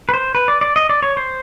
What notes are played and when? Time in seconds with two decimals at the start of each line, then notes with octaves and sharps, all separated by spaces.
0.09 B4
0.14 C5
0.35 B4
0.48 D5
0.61 D5
0.76 D#5
0.89 D5
1.03 C#5
1.17 C5